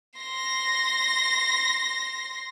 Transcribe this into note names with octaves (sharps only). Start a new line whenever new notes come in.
C6 A#6